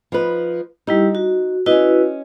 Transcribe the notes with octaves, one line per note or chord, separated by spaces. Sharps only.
F3 D#4 B4
G3 D#4 E4 G4
F#4
C#4 E4 F#4 B4 D#5